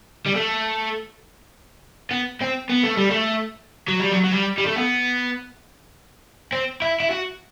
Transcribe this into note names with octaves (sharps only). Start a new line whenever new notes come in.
G3
A3
B3
C4
B3
A3
G3
A3
F#3
G3
F#3
F#3
G3
G3
A3
B3
C4
E4
E4
F#4